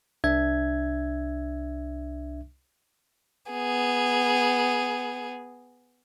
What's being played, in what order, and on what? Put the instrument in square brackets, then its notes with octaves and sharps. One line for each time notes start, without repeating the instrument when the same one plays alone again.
[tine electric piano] C2 D4 E5 G#6
[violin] B3 G#4